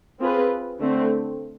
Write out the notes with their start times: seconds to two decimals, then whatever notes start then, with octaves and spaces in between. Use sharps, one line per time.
0.19 C4 F4 G#4 B4
0.79 D3 A3 C4